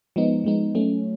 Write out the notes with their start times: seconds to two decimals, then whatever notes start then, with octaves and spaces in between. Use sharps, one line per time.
0.16 F3 G#3 B3 D#4
0.44 F3 G#3 B3 D#4
0.75 F#3 A3 C#4